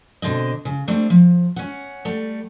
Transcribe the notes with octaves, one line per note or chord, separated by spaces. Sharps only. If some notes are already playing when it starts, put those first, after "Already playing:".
B2 D3 C4 D#5
C#3
G3 A3 C4 D4
F3
C#4 F#5
G3 A3